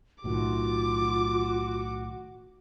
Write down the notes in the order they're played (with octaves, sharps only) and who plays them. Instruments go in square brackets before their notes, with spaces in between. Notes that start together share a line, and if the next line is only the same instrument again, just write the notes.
[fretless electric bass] B1 A2 D#3 [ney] F4 [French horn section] F#4 [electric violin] D6